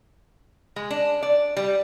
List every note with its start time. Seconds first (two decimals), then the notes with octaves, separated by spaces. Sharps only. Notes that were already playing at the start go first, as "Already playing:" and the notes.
0.76 G#3
0.91 D4
1.23 D5
1.57 G3